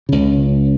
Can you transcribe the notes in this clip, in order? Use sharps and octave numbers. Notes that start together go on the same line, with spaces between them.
C#2 C#3